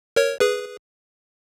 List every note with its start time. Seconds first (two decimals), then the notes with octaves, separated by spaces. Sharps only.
0.16 A#4 C#5
0.40 G#4 B4